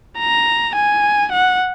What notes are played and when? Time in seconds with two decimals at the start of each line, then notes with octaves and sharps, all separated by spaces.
0.19 A#5
0.76 G#5
1.33 F#5